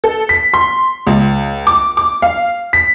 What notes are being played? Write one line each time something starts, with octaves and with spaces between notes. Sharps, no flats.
A4
B6
C6
C#2
D6
D6
F5
B6